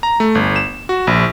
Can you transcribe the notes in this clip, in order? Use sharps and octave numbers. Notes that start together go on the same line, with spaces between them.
A#5
A3
G1
E7
F#4
A#1